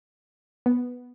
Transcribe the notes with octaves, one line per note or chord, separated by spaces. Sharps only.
B3